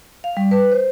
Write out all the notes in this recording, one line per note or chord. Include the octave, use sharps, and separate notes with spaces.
F5
G3
B4
C5